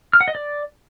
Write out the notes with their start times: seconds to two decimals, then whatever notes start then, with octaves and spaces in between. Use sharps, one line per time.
0.13 F6
0.21 F#5
0.28 D#5
0.35 D5